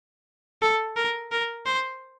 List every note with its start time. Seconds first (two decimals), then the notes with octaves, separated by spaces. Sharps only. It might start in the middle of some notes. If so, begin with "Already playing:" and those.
0.62 A4
0.96 A#4
1.32 A#4
1.66 C5